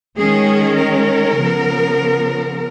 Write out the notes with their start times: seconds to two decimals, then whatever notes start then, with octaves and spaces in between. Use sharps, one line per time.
0.17 D#3 G#3 C#4 G#4
0.78 A#4
1.38 C#3 F3 B3